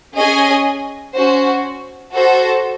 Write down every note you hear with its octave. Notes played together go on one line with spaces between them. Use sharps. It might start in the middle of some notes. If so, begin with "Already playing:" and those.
C#4 G#4 D#5 G#5
C#4 F#4 C5
F#4 A4 C5